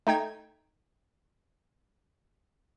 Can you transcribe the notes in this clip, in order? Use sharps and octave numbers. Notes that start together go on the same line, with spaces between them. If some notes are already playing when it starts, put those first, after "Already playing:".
A3 D#4 G5 G#6